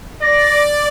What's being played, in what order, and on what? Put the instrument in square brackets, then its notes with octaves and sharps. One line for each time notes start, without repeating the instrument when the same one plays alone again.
[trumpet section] D5 [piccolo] A#6